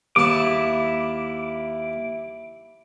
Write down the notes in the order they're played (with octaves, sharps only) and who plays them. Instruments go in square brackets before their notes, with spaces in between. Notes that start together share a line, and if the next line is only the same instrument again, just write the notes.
[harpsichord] D#2 A5 [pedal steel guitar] E4 D6